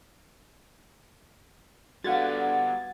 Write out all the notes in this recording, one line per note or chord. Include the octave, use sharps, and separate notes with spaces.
D3 G3 B3 F#4 F5 F#5 G#6 A6